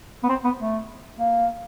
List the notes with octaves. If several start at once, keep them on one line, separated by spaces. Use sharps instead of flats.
B3
C4
B3
A3
A#3